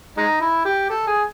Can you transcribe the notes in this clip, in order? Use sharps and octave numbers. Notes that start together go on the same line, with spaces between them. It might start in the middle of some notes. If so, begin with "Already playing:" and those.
G#3 D#4
E4
G4
A4
G#4